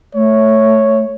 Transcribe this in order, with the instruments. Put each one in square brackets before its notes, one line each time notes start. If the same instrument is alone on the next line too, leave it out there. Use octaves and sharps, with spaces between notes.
[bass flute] A3 [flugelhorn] C#5